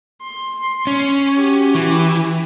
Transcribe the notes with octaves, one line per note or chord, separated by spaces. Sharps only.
C6
C#4
F#4 G4
E3